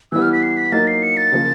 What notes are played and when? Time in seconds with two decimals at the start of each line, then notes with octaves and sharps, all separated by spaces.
0.12 E3 G3 B3 E6
0.22 F6
0.33 B6
0.43 C7
0.57 B6
0.72 F#3 A#3 D#4 A6
0.87 C7
1.02 C#7
1.17 A6
1.32 C#3 F3 A#3